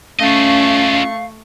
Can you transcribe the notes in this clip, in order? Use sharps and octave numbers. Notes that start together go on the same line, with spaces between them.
A3 C#4 F4 D#5 F5 C#6